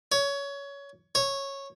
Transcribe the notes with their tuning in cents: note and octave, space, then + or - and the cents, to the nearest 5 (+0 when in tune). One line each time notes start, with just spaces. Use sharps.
C#5 +20
C#5 -10